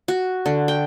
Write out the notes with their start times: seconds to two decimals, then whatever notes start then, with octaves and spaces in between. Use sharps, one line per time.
0.08 F#4
0.46 D3
0.68 G5